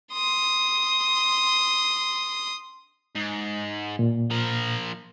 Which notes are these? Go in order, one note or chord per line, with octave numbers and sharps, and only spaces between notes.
C6 D#6
G#2
A#2
F3 A#4